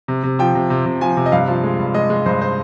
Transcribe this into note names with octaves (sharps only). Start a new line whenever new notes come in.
C3
C3
F3 G5
C3
C3
C3
F3 G#5
C3
D#5
G2 F5
F3
G#3
G2
G#3 D#5
G#3
G2 C5
C5